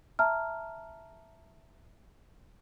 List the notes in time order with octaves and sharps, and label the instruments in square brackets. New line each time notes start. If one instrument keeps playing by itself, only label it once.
[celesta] E5 A5 A#5 F6